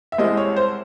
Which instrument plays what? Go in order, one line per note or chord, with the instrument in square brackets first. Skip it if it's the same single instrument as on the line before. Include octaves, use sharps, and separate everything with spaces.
[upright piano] E5
C2 C3 E3 G#3 D#5
C#5
C5